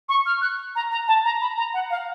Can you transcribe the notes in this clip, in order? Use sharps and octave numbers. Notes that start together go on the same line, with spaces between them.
C#6
F6
F#6
A#5
A#5
A5
A#5
B5
A#5
F#5
F5